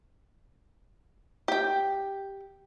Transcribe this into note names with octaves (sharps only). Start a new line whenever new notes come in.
G4 G5